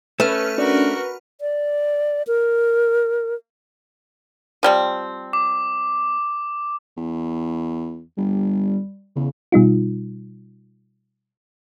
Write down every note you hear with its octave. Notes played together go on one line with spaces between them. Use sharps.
A3 C#4 B4 F6
C#4 D4 F#4 A#4 D5
D5
A#4
F3 G3 C4
D6
E2
G1 G3
E2 C#3
B2 G3 D#4 F4